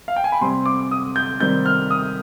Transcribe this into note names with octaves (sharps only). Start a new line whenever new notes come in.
F5
G5
G#5
B5
C3 G3 C4 C6
D6
D#6
G6
C3 D#3 G3 C4 G6
F6
D#6